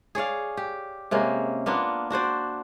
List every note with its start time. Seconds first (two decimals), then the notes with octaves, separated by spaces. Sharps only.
0.15 G#4 C#5 D5 F5
0.57 G4
1.11 C3 G#3 A#3 C#4
1.66 A#3 B3 D4 F4
2.10 D4 F#4 C5 D5